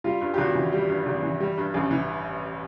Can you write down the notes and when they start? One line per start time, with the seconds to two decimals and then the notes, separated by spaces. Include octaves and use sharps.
0.04 G3 F4
0.21 G2
0.34 G4
0.38 G#1 F#4
0.55 E3
0.72 G3 G4
0.89 G2
1.06 G#1
1.23 E3
1.40 G3
1.58 G2
1.74 A1
1.91 E3